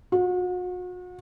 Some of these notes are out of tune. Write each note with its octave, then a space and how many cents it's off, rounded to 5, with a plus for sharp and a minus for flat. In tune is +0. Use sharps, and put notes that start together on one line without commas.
F#4 -40